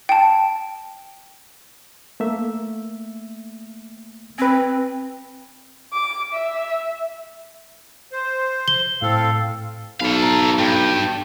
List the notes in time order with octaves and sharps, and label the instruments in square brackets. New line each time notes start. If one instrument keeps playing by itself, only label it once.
[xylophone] G5 A5
[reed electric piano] A3 A#3 E5
[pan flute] C4 [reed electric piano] B4 G#5
[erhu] D6
E5
[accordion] C5
[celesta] G7
[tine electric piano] A2 [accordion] C4 A4 F5
[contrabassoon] B1 [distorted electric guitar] A4 F5
[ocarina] A#5
[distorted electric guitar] G2 [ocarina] G5